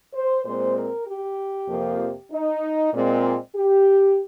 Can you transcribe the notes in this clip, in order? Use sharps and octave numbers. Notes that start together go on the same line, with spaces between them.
C5
A#2 G#3 C4 C5
A#4
G4
F2 C3 F3 A#3
D#4
A#2 G#3 C4
G4